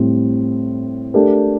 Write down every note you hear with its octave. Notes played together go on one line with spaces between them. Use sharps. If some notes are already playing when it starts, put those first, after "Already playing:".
Already playing: A2 G3 C4
A3 D4 G4 A#4